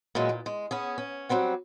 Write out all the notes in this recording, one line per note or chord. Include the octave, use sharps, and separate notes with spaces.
A#2 E3 F#3 G#3
A#2
G#3
B3 C#4 G#4
C#4
F#3 G3 C4 F#5